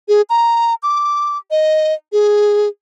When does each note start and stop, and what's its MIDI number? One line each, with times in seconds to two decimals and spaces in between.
0.08 0.22 68
0.30 0.75 82
0.83 1.38 86
1.51 1.94 75
2.12 2.68 68